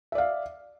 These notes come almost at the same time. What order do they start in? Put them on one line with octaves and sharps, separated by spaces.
E5 D5 F5